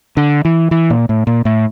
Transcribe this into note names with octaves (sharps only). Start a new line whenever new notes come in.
D3
E3
E3
A#2
A2
A#2
A2